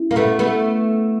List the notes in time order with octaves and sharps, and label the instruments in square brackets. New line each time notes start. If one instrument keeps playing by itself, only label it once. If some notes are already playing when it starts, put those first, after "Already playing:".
Already playing: [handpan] C#4 E4
[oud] A#3
A3 B3
A3 B3